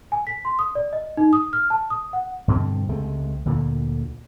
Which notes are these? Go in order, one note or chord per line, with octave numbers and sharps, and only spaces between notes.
G#5
B6
C6
D#6
D5
D#5
D#4
D#6
F6
A5
D#6
F#5
G2 B2 D3 C4
C#2 C3 G#3 A3
D2 A#2 D3